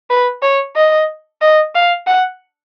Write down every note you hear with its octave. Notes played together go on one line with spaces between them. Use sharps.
B4
C#5
D#5
D#5
F5
F#5